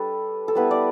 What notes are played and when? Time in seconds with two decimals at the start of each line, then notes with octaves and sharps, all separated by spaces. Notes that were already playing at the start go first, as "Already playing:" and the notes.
Already playing: G3 D4 A4 B4
0.48 A4
0.55 G3 B3 E4 B4
0.71 D5